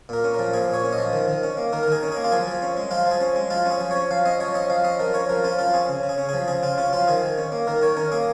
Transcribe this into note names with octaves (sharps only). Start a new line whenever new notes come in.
A#2 A#4
C#4
F3 A#4
A#2 G#4
A#2
C#5
C#4
D#5
F3
D#3
D#3
C#4
A#3
D#3 A#4
A#4
D#3 G#4
C#4
A#3 G#4
F4
F3 G#4
F3
C#4
G#3
F3 F4
F3
G#4
C#4
G#3
F3 F4
C#4 G#4
F3
C#4 C#5
F3 F5
C#4 D#5
F3 C#5
C#4 D#5
F3 F5
C#4 D#5
F3 A#4
C#4 C#5
F3 A#4
C#4 F4
F3 F4
C#4 G#4
C#3
C#3
G#4
C#4
F3 G#4
C#3 G#4
C#3 F4
C#4 F4
F3 F4
D#3 G#4
D#3
C#4
A#3
D#3 A#4
D#3 C#5
C#4 A#4
A#3 G#4